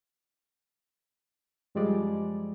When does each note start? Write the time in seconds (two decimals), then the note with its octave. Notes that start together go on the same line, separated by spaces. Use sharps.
1.75 F#2 F3 G3 G#3 D5